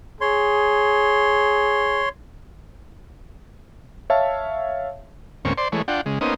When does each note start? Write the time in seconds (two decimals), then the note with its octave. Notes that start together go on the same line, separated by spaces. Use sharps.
0.21 G#4 C#5 C6
4.10 C#5 E5 F5 A5
5.45 D2 G#2 A#3 C4 C#4 C#6
5.58 C5 D5 C6
5.72 E3 G#3 A3 C#5
5.88 D4 F4 F#5 G5
6.06 C#3 G#3
6.21 A#3 B3 C#4 D#4 C5 D#6